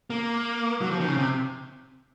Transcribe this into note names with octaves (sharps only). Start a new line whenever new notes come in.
A#3
F#3
F3
D#3
C#3
C3